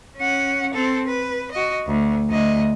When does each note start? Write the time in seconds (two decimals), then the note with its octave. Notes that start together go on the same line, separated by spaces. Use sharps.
0.17 C#4 F#5
0.74 C4 A4
1.07 B4
1.51 F#4 D#5
1.87 D2
2.29 D2 D#5